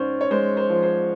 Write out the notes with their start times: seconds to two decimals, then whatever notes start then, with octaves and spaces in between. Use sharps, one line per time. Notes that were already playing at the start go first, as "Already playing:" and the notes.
Already playing: G#2 C#4 C5 D5
0.21 C#5
0.31 G#3 C5
0.57 C5
0.70 F3
0.83 C5